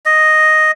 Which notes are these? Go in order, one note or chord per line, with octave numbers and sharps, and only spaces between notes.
D#5